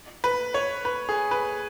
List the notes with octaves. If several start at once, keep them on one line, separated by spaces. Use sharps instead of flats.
B4
C#5
B4
G#4
B4